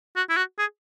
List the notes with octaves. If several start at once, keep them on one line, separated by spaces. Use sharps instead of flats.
F#4
E4
F#4
G#4